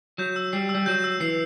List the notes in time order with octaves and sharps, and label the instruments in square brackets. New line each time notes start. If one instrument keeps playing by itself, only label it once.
[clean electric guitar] F#3 [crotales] G6
[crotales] E6
[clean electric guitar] G3 [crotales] C7
[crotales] E6
[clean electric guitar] G3
[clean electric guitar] F#3 [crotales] G6
[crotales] E6
[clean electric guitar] E3 [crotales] C7